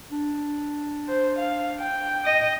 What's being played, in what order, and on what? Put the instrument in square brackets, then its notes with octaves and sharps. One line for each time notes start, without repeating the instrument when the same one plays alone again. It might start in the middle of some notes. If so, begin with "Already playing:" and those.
[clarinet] D4
[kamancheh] C5
F5
G5
[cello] D#5